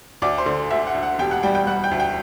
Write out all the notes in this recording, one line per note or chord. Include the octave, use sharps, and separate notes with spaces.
D2 D5 D6
C5 C6
D3
D2 E5
F#5
D2
F#5
E1 G4 G5
F#5 F#6
G3 G5 G6
G5 G6
G3 F#5 F#6
G5 G6
D2
G5 G6